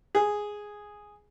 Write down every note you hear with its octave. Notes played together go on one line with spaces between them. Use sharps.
G#4